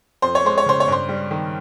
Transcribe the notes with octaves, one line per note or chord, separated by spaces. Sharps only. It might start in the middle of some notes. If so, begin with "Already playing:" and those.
F2 C5
C#5
G#3 C5
C#5
C#3 C5
C#5
G2 C5
G3
D#3